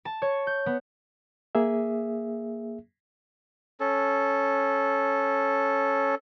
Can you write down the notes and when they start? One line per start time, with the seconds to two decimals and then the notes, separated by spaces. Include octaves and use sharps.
0.05 A5
0.22 C#5
0.47 G6
0.66 B3
1.55 A#3 G#4 E5
3.80 C#4 A4